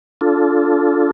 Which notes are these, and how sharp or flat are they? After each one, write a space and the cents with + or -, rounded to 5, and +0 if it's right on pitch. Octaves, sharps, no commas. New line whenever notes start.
D4 -15 F4 +0 A4 -10